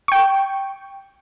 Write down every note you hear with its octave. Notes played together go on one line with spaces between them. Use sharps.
G5 C#6